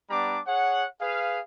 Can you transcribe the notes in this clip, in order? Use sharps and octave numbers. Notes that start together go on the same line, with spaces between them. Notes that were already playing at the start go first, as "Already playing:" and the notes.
G3 B3 D4 A#5 D6
G#4 C#5 F#5
G#4 B4 F5